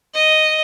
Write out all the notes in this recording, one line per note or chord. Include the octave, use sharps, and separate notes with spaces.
D#5